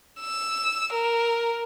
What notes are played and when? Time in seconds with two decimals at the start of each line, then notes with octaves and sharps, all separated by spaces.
0.21 E6
0.93 A#4